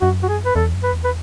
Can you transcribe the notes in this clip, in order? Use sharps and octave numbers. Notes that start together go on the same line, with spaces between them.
F#2 F#4
F#4
G#4
B4
E2 A4
F#2
B4
E2
B4